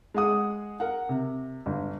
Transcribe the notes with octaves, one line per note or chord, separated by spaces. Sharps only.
G#3 G#4 F#5 D#6
A#4 F#5
C3
G1